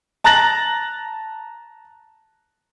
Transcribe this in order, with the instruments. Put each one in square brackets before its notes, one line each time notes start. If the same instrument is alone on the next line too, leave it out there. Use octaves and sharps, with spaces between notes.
[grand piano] A5 A#5 F#6 A6 A#6 F#7